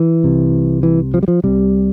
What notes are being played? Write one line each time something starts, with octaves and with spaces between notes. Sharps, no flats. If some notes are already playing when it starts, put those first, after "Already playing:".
Already playing: E3
C2 C3
E3
F3
G3
F3
C2 C3 G3